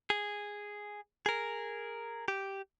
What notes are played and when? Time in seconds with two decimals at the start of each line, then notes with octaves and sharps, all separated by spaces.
0.10 G#4
1.26 G#4 A#4
2.28 G4